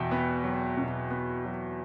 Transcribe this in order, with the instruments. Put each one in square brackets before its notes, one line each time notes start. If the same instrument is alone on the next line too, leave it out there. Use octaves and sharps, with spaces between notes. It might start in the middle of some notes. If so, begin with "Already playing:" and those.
Already playing: [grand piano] E2 B2 E5 G5
B3
F#3
B2
B3
F#3